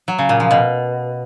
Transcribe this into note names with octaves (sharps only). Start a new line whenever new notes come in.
F#3
C#3
A#2
F3
B2